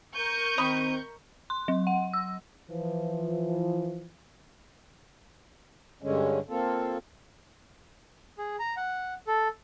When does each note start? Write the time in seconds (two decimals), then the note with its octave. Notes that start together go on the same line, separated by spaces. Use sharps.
0.15 A#4 C#6 G6 D#7
0.58 D#3 C4 D#5 A#5 B5
1.50 C6
1.68 F#3
1.87 F#5
2.13 E6
2.70 E3 F3
6.02 G2 D3 G#3 C#4
6.49 A#3 C4 F4 A4
8.38 G#4
8.59 A#5
8.77 F#5
9.27 A4